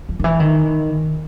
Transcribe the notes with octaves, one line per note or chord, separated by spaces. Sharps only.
F3
D#3
E3
D#3